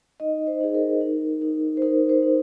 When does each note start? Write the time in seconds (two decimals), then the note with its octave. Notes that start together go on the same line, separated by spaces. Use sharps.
0.20 D#4 D#5
0.47 C5
0.61 D#4 G#4
0.74 A#4
1.01 D#4
1.42 D#4
1.77 C5
1.82 D#4 A#4
2.09 C5
2.22 D#4